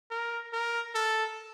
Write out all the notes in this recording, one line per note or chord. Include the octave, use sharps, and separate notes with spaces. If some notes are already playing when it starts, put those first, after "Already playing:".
A#4
A#4
A4